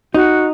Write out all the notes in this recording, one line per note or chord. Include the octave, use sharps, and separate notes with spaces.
D#4 F#4